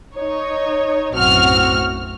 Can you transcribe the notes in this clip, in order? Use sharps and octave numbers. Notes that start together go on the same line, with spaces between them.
D#4 C#5
B1 F#2 A2 C4 F#4 F6